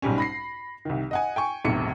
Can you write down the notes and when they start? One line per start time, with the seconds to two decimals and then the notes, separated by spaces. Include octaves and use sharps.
0.02 B1 G#2 G3 C#4
0.18 B5 A#6 C7
0.85 C2 D#3
1.11 D#5 F#5 G#5
1.36 G5 G#5 C#6
1.65 E1 B1 A2 C3 C#7